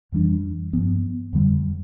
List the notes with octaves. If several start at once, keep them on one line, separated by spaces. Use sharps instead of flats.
F2 E3 G3 D4
G2 F3 B3
F2 D3 G3